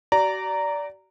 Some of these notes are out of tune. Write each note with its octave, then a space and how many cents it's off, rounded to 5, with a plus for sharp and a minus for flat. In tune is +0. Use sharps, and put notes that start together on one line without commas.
F#4 +45 D5 -15 A#5 -10